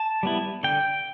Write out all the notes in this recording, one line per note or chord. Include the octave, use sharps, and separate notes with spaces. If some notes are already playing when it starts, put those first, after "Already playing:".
Already playing: A5
G3 B3 E4
D3 G5